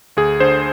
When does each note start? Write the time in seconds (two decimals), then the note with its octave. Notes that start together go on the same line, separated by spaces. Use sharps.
0.17 D2 G#4
0.40 D3 C5